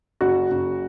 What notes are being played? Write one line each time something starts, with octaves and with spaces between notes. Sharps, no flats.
F#1 F#4
F#1